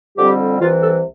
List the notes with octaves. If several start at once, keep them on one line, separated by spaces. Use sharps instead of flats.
F2 D3 G3 C4 G4
C2 C3 E3 F4
A4